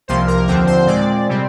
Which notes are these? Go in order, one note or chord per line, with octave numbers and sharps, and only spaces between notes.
C2 C3 F3 A#3 C5
A#4
D#2 D3 F3 C4 A#4
C5
A#2 G#3 C4 D5
C3 G3 C4